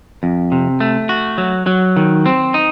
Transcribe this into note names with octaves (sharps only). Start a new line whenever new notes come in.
F2
C3
A3
F#4
F#3
F#3
D#3
C4
D#4